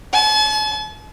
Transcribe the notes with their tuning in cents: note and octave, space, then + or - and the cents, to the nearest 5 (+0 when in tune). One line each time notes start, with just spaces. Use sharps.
A5 -45